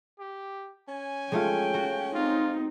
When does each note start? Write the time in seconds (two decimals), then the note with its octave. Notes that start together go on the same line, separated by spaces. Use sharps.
0.19 G4
0.88 C#4 G#5
1.32 G#3 A3 F4 G5
1.74 F#4
2.15 C4 D#4 F4